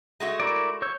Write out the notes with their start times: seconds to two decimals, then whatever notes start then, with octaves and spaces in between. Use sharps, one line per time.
0.20 G#3 A3 F#4
0.40 E4 A#4 D5
0.82 C#5 E6 G6